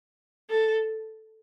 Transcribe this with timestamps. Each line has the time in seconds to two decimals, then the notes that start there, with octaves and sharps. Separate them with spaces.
0.50 A4